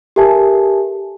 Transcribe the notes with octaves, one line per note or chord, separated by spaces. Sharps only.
G4 A4 A#4 E5 G#5 A5